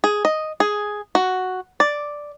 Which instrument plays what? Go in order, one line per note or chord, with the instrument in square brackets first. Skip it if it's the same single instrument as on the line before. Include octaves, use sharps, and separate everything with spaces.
[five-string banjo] G#4
D#5
G#4
F#4
D5